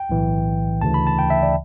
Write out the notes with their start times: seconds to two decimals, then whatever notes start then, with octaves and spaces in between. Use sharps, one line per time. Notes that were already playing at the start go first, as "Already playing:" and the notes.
Already playing: G5
0.10 B1 A2 E3
0.81 D2 C#3 E3 A5
0.94 B5
1.07 A5
1.19 G5
1.30 E5
1.43 D5